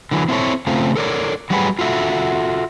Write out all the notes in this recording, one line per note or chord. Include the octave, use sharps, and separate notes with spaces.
D3 E3 F#3
C4 E4 A4 C#5
C#3 A3 C4 F4
A4 A#4 C#5 D5
F#3 G3 A3 F#4 G#4 B4
F4 F#4 A4 E5